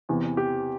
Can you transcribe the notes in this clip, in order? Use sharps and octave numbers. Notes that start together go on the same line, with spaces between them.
E2 C3 E3
G4